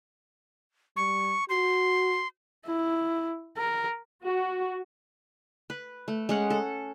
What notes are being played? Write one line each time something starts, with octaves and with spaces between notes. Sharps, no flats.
G3 C#6
F#4 C6
E4
A#4
F#4
B4
A3
G#3 C#4 F#5
A4